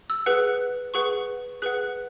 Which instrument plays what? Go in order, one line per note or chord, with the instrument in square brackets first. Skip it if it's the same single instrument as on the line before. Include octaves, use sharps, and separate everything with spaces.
[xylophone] E6
G#4 B4 F#5 F#6
G#4 B4 F#5 C#6
G#4 B4 F#5 F#6